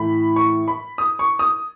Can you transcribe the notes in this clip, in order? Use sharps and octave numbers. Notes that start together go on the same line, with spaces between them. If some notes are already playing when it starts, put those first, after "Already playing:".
Already playing: A2 E3 B5
C#6
B5
D#6
C#6
D#6